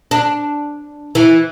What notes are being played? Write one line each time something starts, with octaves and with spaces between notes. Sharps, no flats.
D4
E3